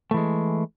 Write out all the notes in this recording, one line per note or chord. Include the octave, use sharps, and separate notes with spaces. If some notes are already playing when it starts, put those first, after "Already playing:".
E3 G#3 A3